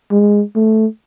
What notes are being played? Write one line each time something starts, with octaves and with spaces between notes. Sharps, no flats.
G#3
A3